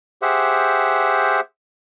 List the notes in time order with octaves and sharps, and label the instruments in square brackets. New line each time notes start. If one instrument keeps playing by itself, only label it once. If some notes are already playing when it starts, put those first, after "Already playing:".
[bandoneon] G4 G#4 C5 E5 F#5